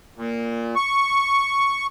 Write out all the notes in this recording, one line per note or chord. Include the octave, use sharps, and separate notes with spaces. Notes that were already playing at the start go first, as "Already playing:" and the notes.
A#2
C#6